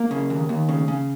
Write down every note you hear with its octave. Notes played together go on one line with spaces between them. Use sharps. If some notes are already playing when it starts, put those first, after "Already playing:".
Already playing: A#3
C#3
D#2
D#2
C#3
C#3